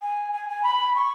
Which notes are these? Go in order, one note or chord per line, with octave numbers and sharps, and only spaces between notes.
G#5
G#5
G#5
B5
C#6